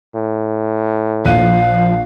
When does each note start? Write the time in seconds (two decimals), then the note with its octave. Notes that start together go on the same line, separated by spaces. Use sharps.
0.15 A2
1.25 A#1 F3 F5 F#6 D#7